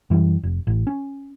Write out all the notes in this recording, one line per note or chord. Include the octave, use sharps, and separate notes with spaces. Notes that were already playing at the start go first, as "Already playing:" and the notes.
F#2 E3 G3
F1
A1
C#4